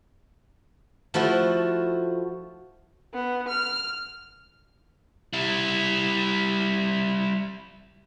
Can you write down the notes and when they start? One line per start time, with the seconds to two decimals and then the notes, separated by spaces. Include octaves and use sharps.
1.14 F3 A3 E4 F#4
3.14 B3
3.49 F6
5.33 G3 E4